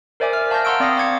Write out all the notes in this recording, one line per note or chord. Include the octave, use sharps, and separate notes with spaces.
A#4 C5 D5 E5 G#5 D6
F6
F5 A5 C#6 F6 G6 A#6
F#5 A#5 C6 C#6 E6 D7
C4 D5 F5 D#6 A#6
D6 E6 G#6 C#7